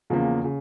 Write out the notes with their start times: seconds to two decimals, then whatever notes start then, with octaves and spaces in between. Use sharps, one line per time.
0.10 E2 C#3 F3 A#3
0.44 C#3